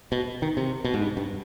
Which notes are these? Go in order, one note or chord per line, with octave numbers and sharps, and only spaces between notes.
B2
D#3
C3
B2
G#2
G2
G2